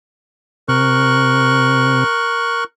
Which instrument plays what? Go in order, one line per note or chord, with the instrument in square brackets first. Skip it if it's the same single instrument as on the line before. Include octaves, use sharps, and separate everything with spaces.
[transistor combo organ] C3 [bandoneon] A#4 C#6 F#6